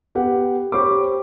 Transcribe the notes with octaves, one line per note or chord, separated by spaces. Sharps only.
B3 G4 F#5
G4 C5 C#5 B5 C#6 D6